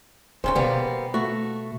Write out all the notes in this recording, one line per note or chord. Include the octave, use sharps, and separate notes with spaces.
D1 D2 G#2 C#4 C5
B2 G3 A#3 B3
A3 F#4